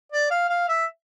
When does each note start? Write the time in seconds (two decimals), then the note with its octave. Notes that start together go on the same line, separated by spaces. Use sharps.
0.12 D5
0.30 F5
0.49 F5
0.68 E5